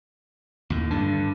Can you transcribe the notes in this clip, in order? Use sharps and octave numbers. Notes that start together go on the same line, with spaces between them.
D#2 A2
G2 D3